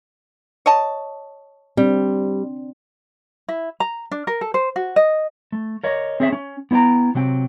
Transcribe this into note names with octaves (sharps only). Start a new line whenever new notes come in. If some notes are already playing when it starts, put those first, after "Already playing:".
C#5 D#5 A5
G3 C4 D4
E4
A#5
D4
A#4
A4
C5
F#4
D#5
A3
A#4 C#5 D#5
C4 G#4 C#5 D5 E5
C#4
B3 E4 C#5 G5 A#5
C3 F#3 C4 G5